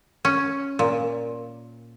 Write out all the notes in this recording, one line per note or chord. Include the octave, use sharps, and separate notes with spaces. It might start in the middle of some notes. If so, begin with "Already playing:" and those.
C#4
A#2